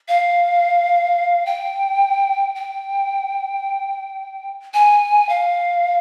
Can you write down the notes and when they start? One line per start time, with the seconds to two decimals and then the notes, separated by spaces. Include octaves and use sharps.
0.08 F5
1.46 G5
2.55 G5
4.74 G#5
5.29 F5